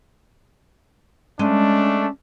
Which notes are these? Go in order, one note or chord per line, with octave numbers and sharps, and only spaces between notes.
G#3 A3 C#4 D4 D#5